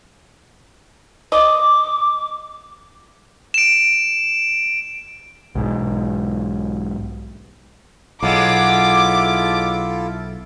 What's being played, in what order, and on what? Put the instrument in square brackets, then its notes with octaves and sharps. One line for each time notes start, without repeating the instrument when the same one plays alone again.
[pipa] D#5 [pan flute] D6
[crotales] D7 E7
[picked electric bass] B1 G#2
[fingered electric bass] B1 [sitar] F#3 G#3 [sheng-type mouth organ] E4 F4 A4 [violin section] D6